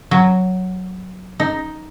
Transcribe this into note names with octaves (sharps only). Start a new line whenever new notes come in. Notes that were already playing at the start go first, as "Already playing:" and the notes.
F#3
D#4